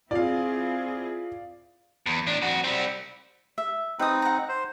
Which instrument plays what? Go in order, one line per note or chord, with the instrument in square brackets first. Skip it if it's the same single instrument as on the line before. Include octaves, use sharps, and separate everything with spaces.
[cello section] C4 E4 G#4 [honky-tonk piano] F4 [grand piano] D5 F5
[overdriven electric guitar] E2
A2 D4
F2 F#4
G3 C4
[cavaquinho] E5
[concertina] C4 D#4 [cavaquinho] B4 D#6
[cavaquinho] F#5 A#5
[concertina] C5